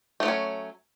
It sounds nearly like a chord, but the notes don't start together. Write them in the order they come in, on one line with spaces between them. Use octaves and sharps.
A3 F3 F#3 C#4